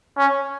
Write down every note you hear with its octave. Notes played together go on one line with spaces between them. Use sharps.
C#4